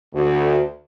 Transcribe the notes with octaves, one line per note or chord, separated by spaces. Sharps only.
D2